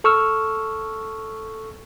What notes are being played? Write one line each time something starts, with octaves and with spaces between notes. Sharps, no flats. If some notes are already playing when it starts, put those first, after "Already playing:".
A4 C#6 E6 F6